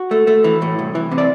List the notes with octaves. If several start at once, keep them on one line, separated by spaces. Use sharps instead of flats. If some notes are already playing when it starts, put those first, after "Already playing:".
Already playing: F#4
A3
A3
E3
A2
C2
E3
C3
D5